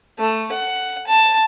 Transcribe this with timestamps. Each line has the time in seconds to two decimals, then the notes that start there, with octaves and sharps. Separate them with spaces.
0.19 A3
0.53 F#5
1.07 A5